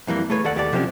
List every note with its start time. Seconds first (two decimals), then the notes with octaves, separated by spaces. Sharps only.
0.07 F2 E3 G3 A#3
0.30 A3 G#4 B4 C#5
0.44 D#2 A4 D5 F#5
0.56 D#2 G4 A4 D5
0.72 C3 F3 F#3 C4 C#4 G4